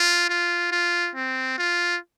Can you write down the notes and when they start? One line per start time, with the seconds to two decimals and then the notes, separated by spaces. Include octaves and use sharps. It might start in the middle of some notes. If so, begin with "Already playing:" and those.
Already playing: F4
0.29 F4
0.72 F4
1.15 C4
1.58 F4